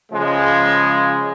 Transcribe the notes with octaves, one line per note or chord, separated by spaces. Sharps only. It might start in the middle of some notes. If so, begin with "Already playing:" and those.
C#3 F3 G#3